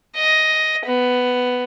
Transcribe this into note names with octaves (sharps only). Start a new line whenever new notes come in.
D#5
B3